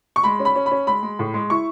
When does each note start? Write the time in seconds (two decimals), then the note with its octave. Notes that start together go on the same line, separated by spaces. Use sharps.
0.16 C#6
0.24 G#3 B5
0.39 C#4
0.45 B5
0.55 C#4
0.66 B5
0.71 C#4
0.87 G#3 B5
1.03 G#3
1.19 A2
1.34 G#3
1.50 E4 C#6